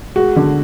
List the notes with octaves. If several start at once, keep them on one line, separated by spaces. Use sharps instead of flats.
G#3 F#4
D3